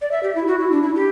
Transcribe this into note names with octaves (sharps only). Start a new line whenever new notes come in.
D5
E5
G4
E4
F#4
E4
D4
E4
G4